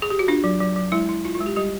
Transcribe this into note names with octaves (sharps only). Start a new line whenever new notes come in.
G#4
G4
F#4
D4 F4
F#3
F#3
F#3
G#3 E4
E4
E4 F4
F4
G#3
G4
G3 G4